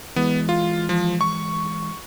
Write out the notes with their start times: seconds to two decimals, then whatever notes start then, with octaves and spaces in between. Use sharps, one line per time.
0.16 E3 G#3 B3
0.49 F4
0.89 F3
1.21 C#6